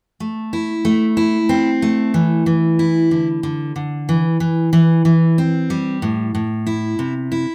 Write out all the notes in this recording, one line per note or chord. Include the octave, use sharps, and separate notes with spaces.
A3
E4
A3
E4
C4
A3
E3
E3
E4
D3
D3
D3
E3
E3
E3
E3
C4
G3
A2
A2
E4
C3
E4